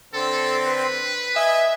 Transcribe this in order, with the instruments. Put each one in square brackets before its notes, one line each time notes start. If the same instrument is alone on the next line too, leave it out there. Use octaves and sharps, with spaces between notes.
[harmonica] D3 C4 [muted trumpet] A4
[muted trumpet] B4
[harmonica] D#5 G#5 [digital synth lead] E5